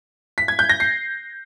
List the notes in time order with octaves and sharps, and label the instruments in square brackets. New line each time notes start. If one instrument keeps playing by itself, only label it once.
[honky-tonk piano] B6
G#6
G6
A#6
C7